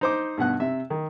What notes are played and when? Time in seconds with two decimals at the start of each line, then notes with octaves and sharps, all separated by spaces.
0.01 D#4 C5 D6
0.38 G2 B2 F#5 F#6
0.60 C3 E5
0.90 D#3